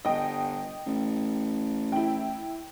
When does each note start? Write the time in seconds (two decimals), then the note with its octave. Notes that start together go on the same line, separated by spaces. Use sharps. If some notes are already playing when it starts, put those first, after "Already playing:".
0.05 G1 D#5 G5
0.87 A1
1.92 E4 G5